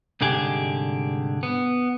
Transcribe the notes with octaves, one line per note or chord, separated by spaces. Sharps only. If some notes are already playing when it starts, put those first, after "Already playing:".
C2 G#2 D3 G4 G#4
B3